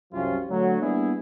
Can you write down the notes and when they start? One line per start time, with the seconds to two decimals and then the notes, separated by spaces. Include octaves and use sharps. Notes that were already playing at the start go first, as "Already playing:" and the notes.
0.13 C2 F#2 C3 F3 C#4 F4
0.49 D2 F#3
0.81 G3 A#3 B3 D4 E4 G#4